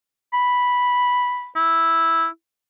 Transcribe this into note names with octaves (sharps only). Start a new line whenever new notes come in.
B5
E4